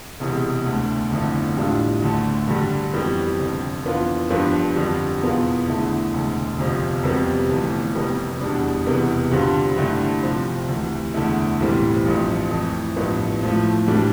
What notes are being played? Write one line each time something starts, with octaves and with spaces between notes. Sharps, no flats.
E1 E2 C3
D2 D3 A3
G1 F2 D3 A3 E4
A1 A2 G3 D4 F4
D2 D3 A3
G2 D3 G3
F2 E3 G3 B3
F1 F2 D3
F2 E3 B3 D4 F4
G2 F3 B3 D4 F4
F2 D3 G3
E2 B2 B3 F4
E2 D3 A3 E4
E1 D2 D3
G1 F2 C3 F3
F2 C3 G3 B3
G1 F2 E3 A3
F1 F2 C3 G3 B3
E1 E2 B2 G3 D4
E1 E2 C3 E3 B3
G2 D3 G3 C4 F4
G2 D3 A3 E4
C2 C3 F3 C4
D2 C3 E3
E2 D3 A3 E4
B1 A2 E3 G3 C4
A1 G2 F3 C4
F2 E3 A3
A1 G2 F3 B3 E4
A2 F3 A3
A2 E3 G3 D4